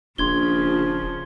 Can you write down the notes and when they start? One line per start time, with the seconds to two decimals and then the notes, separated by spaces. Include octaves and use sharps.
0.18 D#1 A#1 C#3 F3 C6 G#6 G7